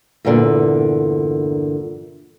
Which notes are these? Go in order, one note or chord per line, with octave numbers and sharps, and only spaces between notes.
E2 G2 A#2 D3